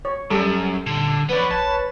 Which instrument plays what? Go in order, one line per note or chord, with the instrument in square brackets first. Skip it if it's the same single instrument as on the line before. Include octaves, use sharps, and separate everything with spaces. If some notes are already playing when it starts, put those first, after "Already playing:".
[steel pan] C#5
[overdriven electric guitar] F#2 [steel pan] G3 A4
[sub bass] A#2 [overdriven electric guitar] D3
[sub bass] F3 [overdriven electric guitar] B3 D5 [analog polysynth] B4 C#5
[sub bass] A#1 [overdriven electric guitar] A5